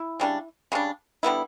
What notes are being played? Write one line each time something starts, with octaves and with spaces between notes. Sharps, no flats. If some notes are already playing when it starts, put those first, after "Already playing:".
Already playing: E4
C#3 G3 D4
C#3 G3 D4
D3 G3 B3 E4